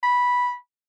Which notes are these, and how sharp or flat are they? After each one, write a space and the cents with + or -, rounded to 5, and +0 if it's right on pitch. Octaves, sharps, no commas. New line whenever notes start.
B5 -10